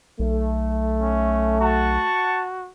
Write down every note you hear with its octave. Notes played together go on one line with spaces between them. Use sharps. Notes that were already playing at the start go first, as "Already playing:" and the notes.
B1 A3
C#4
F#4 F#5 A5 C#6